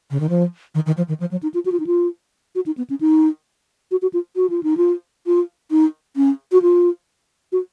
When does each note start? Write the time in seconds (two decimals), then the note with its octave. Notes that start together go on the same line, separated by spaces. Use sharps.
0.11 C#3
0.20 D#3
0.29 F3
0.75 D#3
0.86 D#3
0.97 F3
1.08 D#3
1.20 F3
1.31 F#3
1.43 D#4
1.54 F4
1.65 F#4
1.72 F4
1.80 D#4
1.86 F4
2.55 F#4
2.66 D#4
2.77 B3
2.90 C#4
3.01 D#4
3.91 F#4
4.02 F#4
4.13 F4
4.36 F#4
4.50 F4
4.63 D#4
4.77 F4
5.27 F4
5.71 D#4
6.16 C#4
6.52 F#4
6.62 F4
7.52 F#4